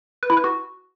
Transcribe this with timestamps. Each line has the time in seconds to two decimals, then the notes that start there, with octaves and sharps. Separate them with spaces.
0.23 B4
0.30 E4
0.37 B4
0.44 F#4